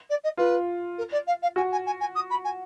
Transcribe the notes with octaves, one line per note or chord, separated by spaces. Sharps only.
D5
D#5
F4 B4
A#4
D5
F5
F5
F#4 G#5
G#5
G#5
G#5
D#6
B5
G#5